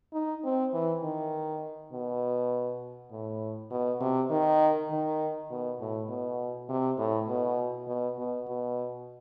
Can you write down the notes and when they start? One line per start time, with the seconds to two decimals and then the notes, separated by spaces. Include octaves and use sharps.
0.13 D#4
0.44 C4
0.74 E3
1.03 D#3
1.93 B2
3.11 A2
3.71 B2
4.01 C3
4.30 D#3
4.90 D#3
5.51 B2
5.80 A2
6.09 B2
6.69 C3
6.98 A2
7.28 B2
7.88 B2
8.19 B2
8.48 B2